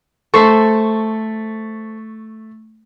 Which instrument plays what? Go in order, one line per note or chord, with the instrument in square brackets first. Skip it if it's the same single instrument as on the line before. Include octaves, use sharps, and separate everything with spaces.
[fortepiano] A3 C#6 [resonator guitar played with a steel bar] A4 C5